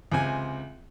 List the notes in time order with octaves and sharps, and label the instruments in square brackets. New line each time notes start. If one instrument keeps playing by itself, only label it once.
[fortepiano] C#2 C3 C4 G#5